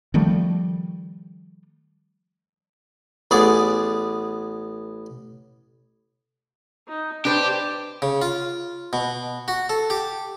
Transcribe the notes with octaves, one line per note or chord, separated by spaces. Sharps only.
D#3 F3 G3 A3
A1 B3 G#4 D5
D#4
D4 G4 B4 C5 G5 A5
C#3
F4
B2
F#4
A4
G4